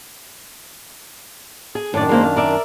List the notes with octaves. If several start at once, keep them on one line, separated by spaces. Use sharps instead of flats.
G#4
F#2 A2 D#3 D4 D5
G#3 A#3 C5
F5
A#4 D5 E5